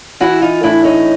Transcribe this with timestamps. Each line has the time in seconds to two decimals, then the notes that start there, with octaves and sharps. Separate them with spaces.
0.20 E3 E4 F#4
0.42 D#4 F4
0.63 A2 D4 E4
0.84 C#4 D#4